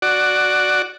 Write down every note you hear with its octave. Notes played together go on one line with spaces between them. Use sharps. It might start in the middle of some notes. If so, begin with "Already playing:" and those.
F#4 D5